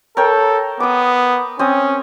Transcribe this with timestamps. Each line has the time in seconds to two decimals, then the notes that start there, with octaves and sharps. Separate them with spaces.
0.17 A4 A#4 C#5 G5
0.80 B3 D6 D#6
1.59 C4 C#4 D#6